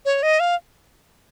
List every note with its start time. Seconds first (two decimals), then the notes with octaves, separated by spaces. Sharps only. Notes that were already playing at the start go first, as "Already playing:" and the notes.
0.05 C#5
0.23 D#5
0.40 F5